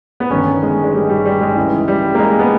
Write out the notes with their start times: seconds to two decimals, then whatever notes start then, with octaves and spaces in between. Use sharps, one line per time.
0.20 B3
0.30 G1 G2 D#3 C#4
0.62 G#3
0.84 G#3
0.94 G3
1.10 G3
1.25 G3
1.41 G#3
1.56 C#2 C#3 E3 G#3
1.88 G3
2.15 A#3
2.19 G#3
2.39 B3